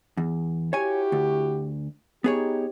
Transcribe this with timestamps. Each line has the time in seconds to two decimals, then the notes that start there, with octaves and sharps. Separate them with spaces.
0.17 E2
0.73 E4 F#4 G4 C#5 G#5
1.12 D2
2.24 B3 D#4 G4 G#4 C#5